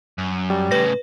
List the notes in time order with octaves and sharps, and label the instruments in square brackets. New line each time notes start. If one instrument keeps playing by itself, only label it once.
[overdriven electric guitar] F#2
[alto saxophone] G3
[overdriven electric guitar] A2 C#3 [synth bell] B4 A#6